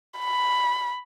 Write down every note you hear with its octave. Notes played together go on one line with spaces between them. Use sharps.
B5